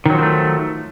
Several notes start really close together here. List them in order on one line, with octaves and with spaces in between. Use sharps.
D#3 F#3 F3 C4 A3